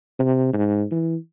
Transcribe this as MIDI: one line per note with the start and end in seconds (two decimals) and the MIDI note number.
0.19 0.48 48
0.53 0.83 44
0.91 1.16 52